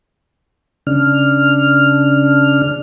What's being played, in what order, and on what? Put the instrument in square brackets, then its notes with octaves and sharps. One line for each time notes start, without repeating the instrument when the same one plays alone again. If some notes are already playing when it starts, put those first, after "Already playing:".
[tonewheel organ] C#3 D4 F6